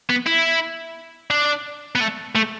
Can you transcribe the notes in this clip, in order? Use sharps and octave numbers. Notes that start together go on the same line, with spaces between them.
B3
E4
D4
B3
A3
A3